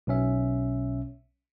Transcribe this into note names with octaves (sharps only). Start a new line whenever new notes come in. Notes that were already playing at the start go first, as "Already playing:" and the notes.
B1 B2 C#4 E5